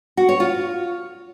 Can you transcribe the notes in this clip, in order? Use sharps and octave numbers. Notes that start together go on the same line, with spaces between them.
F#4
C#5
F4